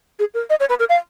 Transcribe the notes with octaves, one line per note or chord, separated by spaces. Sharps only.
G#4
A#4
D#5
C#5
B4
A#4
F5